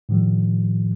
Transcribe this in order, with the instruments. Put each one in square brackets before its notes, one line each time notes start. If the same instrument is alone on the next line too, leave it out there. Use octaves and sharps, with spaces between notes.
[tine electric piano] A2 D#3 F3 G3